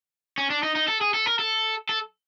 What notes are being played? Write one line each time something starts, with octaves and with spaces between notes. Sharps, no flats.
C#4
D4
D#4
D#4
A4
G#4
A4
A#4
A4
A4